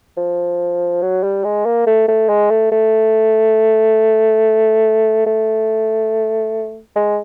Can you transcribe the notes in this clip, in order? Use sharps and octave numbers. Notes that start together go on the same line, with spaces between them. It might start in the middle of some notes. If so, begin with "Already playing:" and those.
F3
F#3
G3
G#3
A#3
A3
A3
G#3
A3
A3
A3
G#3